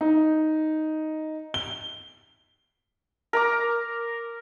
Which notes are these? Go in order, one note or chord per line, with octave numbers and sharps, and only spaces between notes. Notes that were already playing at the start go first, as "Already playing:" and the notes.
D#4
G7
A#4 A#5 D6